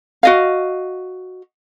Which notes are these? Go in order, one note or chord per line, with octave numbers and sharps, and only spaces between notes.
F#4 D#5 F5